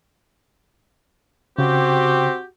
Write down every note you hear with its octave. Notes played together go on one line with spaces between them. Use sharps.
C#3 C4 F#4 G4